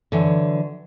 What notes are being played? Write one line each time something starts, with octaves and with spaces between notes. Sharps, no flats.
D3 E3 F#3